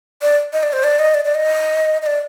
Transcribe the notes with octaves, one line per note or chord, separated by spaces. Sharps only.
D5
D#5
D5
C5
D5
D#5
D5
D5
D#5
D#5
D5